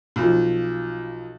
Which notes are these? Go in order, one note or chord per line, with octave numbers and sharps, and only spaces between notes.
B1 F3